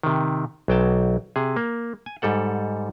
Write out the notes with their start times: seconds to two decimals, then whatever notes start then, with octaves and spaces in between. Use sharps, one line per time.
0.03 C3 D#3
0.68 B1 F#3 G5 A5
1.36 C3 G#4
1.56 A#3
2.06 G#5
2.22 G#2 G3 A4 F#5